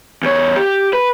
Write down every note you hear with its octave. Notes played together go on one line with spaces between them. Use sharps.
E2 C#5
G4
B4